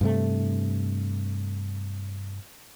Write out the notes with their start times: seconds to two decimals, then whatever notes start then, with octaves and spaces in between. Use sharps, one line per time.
0.01 G2 C3 A3